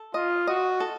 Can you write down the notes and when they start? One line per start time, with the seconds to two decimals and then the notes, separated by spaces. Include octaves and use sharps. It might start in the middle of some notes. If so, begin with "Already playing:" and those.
Already playing: A4
0.14 F4 D#5
0.47 F#4 D#5
0.80 A4